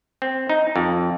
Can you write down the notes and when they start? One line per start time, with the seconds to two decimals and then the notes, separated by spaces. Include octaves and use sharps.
0.22 C4
0.50 D#4
0.76 F2